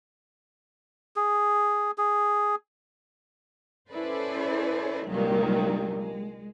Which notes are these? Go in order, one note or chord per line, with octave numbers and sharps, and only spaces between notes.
G#4
G#4
C#4 E4 A4 B4 C5 D5
C2 G2 A#2 D#3 F#3 G#3
G#3